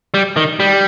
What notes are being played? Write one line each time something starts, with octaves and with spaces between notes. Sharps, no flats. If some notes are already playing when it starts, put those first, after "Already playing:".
G3
D#3
G3